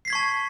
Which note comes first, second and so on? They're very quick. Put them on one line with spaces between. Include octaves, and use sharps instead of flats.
C7 B6 G#6 C#6 A5